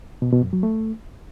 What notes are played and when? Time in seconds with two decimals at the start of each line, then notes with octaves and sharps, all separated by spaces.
0.22 B2
0.32 B2
0.43 F#2
0.53 F#3
0.63 A3